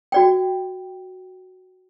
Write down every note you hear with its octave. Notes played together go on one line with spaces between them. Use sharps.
F#4 D5 G5